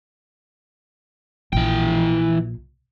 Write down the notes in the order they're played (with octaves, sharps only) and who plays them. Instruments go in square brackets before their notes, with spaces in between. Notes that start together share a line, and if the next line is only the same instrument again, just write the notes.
[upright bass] A#1 [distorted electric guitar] E3 G5